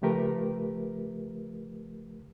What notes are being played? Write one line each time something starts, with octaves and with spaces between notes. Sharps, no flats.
C#3 F3 A3 G4 A#4 B4